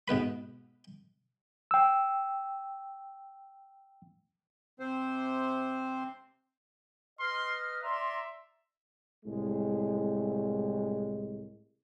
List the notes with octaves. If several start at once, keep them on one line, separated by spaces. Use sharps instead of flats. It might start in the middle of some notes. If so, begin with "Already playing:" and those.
G#2 B2 B4 B5
G5 E6
C3 C4 C5
B4 D#5 C6 F6
D5 E5 A#5 C6
C2 A2 G#3